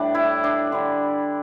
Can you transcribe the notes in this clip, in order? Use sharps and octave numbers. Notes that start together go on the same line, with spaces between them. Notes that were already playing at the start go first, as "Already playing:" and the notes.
Already playing: A2 G3 D4
E4
D4
D3 G3